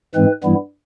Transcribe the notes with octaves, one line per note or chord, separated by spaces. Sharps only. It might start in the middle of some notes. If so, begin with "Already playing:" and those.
G#2 E3 G#3 C4 B4
G2 E3 G3 B3 E4